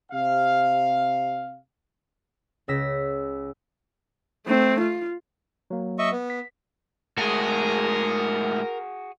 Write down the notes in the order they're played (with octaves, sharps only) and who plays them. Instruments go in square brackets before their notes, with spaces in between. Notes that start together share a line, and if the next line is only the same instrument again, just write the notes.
[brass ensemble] C3 F5
[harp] C#2 C#3 E6 A#6 B6
[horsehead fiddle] A3 C4
F4
[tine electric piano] F#3 A#3
[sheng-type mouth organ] D#5 E5 C#6
B3
[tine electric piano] B6
[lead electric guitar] A2 G#3 [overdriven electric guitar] F#4 G#4 [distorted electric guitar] A#4